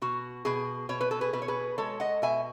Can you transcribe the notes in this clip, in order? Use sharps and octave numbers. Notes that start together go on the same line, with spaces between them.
B2 F#4
B2 G#4
B2 C#5
B4
A4
G#4 B4
B2 B4
C#5
G#4 B4
G#3 A4 C#5
D#5 F#5
B2 E5 G#5